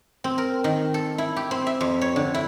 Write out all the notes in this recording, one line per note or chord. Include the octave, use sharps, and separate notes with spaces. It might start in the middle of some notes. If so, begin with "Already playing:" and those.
C4
A#4
D#3
A4
E4
G4
C4
E5
F2
C#5
D3
E4